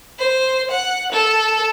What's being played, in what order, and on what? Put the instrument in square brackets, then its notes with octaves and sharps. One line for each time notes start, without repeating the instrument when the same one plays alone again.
[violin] C5
F#5
A4